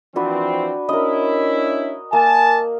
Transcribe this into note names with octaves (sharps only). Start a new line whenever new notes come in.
E3 F3 C4 D4 F#4 B4
C#4 D4 E4 A#4 D#5
A#3 G#5 A5